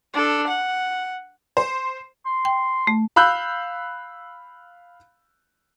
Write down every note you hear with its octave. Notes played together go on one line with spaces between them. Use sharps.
D4 A4
F#5
C5
C6
G5
A3
F5 B5 E6 F#6 G6